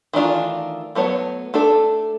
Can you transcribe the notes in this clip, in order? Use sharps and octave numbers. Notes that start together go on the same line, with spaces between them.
D#3 E3 A3 D4 F4
F#3 A3 B3 C#5
A3 D4 A4